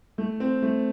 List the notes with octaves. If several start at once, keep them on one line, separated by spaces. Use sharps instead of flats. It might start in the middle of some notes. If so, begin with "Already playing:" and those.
A3
C4
A3